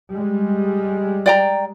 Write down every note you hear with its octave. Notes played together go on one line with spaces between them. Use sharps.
G3 G#3
D5 G5 A#5